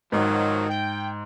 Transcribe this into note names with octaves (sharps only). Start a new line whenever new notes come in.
G#2 D#3 F3 F#3
G5